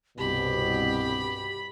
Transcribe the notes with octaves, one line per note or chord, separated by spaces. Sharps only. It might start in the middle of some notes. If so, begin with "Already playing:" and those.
C2 G2 B2 G4 B5